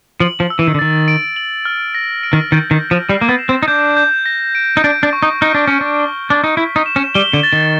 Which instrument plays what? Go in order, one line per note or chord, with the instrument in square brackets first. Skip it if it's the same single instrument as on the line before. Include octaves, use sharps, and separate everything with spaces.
[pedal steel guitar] F3 [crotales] F#7
[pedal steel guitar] F3
[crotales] E6
[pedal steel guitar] E3
D#3
D3
[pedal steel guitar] D#3 [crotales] A6
[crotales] D7
F#7
F6
A#6
D7
[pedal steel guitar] D#3
[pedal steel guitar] D#3 [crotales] G6
[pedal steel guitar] D#3
[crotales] G6
[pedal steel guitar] F3
[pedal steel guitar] G3 [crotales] C7
[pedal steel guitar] A#3
B3
[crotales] E7
[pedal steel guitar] C4
D#4
[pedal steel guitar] D4 [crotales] G6
[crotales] G6
A#6
D7
[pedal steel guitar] D#4
[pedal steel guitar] D4 [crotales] D7
[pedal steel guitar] D4
[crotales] C#6
[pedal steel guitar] D#4
[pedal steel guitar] D#4 [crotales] F6
[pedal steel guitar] D4
[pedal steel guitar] C#4 [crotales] A#6
[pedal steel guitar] D4
[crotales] G7
[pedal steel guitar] D4 [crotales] G6
[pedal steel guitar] D#4
[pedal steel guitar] E4 [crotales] B6
[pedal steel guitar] D#4
[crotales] E7
[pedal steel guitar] C#4
[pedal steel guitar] G3 [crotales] G7
[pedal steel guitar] D3
[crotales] A6
[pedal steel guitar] D#3